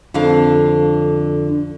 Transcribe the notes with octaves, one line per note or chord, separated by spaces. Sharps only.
F2 D3 D4 F5